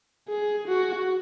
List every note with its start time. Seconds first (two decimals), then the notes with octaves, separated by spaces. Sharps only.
0.28 G#4
0.67 F#4